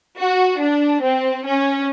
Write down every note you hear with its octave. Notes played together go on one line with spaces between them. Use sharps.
F#4
D4
C4
C#4